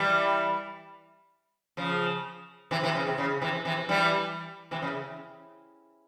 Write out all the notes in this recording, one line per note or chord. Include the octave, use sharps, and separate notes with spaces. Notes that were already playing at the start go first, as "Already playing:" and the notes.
Already playing: E3 G3
C#3 F3
C3 E3
C3 E3
C#3
C3
C#3
C3 E3
C3 E3
E3 G3
C3 E3
C#3